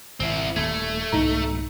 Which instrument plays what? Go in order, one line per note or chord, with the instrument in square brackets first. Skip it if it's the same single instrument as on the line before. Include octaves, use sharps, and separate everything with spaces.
[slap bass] G#1 [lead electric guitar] C4 E4
[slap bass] D#1 [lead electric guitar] A3 [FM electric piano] G#6
[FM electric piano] C2 D#4 A#5 [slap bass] G#2 B2 D#3